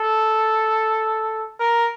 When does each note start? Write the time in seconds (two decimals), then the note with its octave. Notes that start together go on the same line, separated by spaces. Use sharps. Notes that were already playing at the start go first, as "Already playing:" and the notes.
Already playing: A4
1.60 A#4